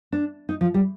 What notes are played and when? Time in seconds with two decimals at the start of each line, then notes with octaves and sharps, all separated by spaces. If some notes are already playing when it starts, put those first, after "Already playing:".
0.12 D4
0.49 D#4
0.61 F3
0.74 G3